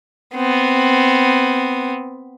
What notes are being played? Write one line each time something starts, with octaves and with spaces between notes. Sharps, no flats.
B3 C4